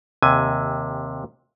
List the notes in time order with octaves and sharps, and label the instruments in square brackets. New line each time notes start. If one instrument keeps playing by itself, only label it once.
[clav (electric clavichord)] D#2 C3 G#5